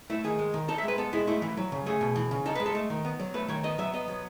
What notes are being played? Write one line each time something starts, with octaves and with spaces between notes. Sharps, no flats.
A3 E4
D#3 G#4
G#3
D#3
D#4 A4
E5
G#3 B4
B3 A4
G#3 E4
A3 E4
E3
F#3
C#3
A3 G#4
B2
E3
C#3
D#4 A4
B4
G#3
A4
A3
D#3
B3
F#3
A3 B4
D#3 C#5
B3 D#5
F#3 E5
B3 D#5
F#3